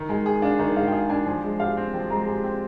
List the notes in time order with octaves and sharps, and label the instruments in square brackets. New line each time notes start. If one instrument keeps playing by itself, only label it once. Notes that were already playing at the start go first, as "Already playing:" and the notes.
Already playing: [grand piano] D#3
[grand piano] G#3 [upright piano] G#5
[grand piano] G#4 [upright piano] G5
[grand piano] D4 [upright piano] F5
[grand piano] D#3 [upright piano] D#5
[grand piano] G#3 [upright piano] F5
[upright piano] G5
[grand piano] G#4 [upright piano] F5
[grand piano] D4 [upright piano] G#5
[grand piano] F3 [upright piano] G#5
[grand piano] G#3
[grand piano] G4 [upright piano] F5
[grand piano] C4
[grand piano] F3 [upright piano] G5
[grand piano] G#3 [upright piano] A#5
[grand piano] G4 [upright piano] G#5
[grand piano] C4 [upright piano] G5